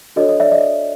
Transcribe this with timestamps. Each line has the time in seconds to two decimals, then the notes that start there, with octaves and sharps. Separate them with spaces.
0.16 D4 F#4 A4 C#5 D#5
0.29 D#5
0.40 D5 E5
0.52 D#5